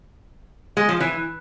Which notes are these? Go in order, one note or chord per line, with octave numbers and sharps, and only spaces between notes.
G#3
F3
E3